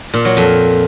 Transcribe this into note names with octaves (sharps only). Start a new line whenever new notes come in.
A#2
F#3
F2